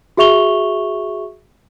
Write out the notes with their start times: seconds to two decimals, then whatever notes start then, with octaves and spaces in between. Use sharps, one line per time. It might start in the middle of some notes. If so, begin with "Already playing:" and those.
0.17 F#4 G#4 E5 C#6 F7 G7